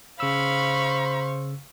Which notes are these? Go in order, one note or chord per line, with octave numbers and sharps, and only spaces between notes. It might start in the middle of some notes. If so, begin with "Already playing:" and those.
C#3 C5 F5 B5 C#6 E6